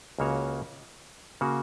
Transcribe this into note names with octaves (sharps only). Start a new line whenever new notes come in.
C#2 C#3 A#3 F#4 C#5
C#3 A#3 F#4